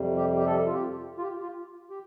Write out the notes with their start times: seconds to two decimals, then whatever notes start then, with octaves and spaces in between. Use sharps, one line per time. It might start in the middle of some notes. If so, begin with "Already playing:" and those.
Already playing: F2 C3 G3
0.17 G4
0.39 G4
0.46 A4
0.67 F4
0.74 G4
1.18 F4
1.23 G4
1.42 F4
1.90 G4